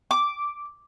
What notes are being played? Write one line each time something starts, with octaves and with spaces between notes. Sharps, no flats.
D6